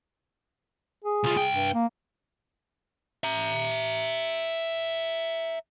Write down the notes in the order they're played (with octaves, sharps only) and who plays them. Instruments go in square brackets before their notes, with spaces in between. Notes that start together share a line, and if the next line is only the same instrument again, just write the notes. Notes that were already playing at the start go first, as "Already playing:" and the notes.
[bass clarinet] G#4
[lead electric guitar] C2 F4
C2 G5
[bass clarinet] G2
A#3
[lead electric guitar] E5 A#5